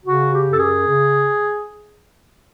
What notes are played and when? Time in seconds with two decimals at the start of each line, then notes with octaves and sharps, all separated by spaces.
0.06 C#3 F#4
0.32 G4
0.46 F#2
0.51 A4
0.59 G#4
0.86 C#3